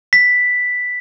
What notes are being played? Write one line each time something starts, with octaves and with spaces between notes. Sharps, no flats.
B6